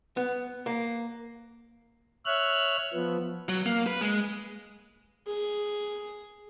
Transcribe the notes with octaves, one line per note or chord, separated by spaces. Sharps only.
B3
A#3
C#5 E5 F6 F#6
F3 B3
F#3
A#3
B4
G#3
G#4